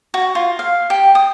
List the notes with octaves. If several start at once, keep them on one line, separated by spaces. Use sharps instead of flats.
F#4
F4
F5
G4
D#6